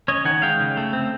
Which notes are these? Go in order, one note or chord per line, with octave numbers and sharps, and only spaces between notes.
C#4 C#5 D#5
D#3 F#5 G#5
G#3 F5 G5
C#3
A3
C4